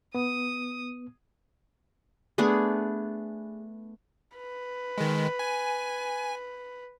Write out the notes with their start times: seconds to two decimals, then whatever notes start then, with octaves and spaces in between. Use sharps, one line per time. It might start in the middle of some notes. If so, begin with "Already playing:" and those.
0.15 B3 D#6
2.38 A3 B3 D4 G#4
4.38 B4
4.98 D#3 G#3
5.39 G#5